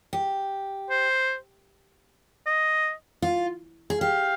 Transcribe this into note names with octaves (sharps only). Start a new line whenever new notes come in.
G4
C5
D#5
F4
G#4
G4 F5